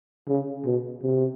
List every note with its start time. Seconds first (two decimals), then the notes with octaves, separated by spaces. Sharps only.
0.28 C#3
0.65 B2
1.03 C3